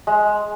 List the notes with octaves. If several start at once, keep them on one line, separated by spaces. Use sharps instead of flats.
G#3